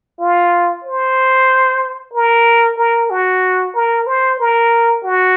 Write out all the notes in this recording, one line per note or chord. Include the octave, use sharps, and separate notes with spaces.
F4
C5
A#4
A#4
F#4
A#4
C5
A#4
F#4